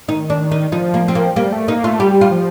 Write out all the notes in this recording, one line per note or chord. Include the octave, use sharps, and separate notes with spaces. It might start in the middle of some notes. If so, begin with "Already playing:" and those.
D#3 D#4
D4
D#4
F3 D#4
A#3
C4
A#3
G3 A#3
A3
A#3 D#4
A3 F4
G3 G4
F4
F3